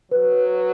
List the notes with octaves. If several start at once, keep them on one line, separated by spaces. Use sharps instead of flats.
F#3 B4